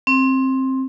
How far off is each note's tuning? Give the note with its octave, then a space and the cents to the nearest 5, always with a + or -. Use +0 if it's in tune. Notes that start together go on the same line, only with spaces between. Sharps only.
C4 +15